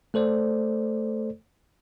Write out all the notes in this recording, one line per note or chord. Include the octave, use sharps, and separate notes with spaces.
A3 A4 C5 D5